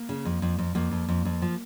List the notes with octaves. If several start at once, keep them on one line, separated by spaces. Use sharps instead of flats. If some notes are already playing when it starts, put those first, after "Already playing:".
Already playing: A#3
C#3
F2
F2
F2
F2 A#3
F2
F2
F2
F3